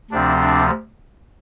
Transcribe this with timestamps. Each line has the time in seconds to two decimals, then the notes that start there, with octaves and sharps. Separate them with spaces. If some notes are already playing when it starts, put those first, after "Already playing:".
0.11 D2 C3 F3 C4 D4
0.41 D4